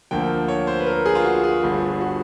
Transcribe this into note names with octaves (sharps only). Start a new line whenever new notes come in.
D2 D3 F3 A#3 G5
C#5
C5
B4
A#4
G#4
F4
F#4
G#4
G1 G2 D3
F#4